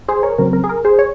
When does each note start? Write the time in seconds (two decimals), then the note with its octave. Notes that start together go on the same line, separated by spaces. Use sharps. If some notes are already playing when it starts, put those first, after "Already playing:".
0.08 G#4 C5
0.23 A#4 C#5
0.38 C#3 F#3 C4 A#4
0.53 A#4
0.64 G#4
0.69 A#4
0.85 G#4 C5
0.99 C#5